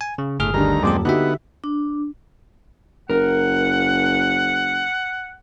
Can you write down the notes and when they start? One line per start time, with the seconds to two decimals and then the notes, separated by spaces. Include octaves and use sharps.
0.01 G#5
0.18 C#3
0.39 G1 A2 G#4 F6
0.54 D2 D#3 G3 D4 A#5
0.83 D#1 F#2 G#3 C4 G4 D5 D6
1.05 D3 B3 D#4 F#4 G4 E5 F#5
1.64 D4
3.10 F#1 A#4 F#5